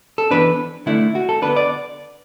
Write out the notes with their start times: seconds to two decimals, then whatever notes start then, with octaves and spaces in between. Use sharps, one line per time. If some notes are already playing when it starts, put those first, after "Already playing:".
0.18 A4
0.31 E3 B3 D4 B4
0.86 D3 A3 D4 E4
1.15 F#4
1.29 A4
1.42 D3 B3 D4 B4
1.57 D5